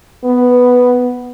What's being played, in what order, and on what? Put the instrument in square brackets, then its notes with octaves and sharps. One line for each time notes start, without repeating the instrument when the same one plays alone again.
[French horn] B3